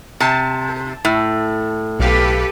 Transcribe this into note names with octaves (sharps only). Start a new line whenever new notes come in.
C3 A5
A2
B1 G4 A4 B4 F5